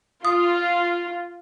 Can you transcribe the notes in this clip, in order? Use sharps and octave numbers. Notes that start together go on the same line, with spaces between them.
F4 D#6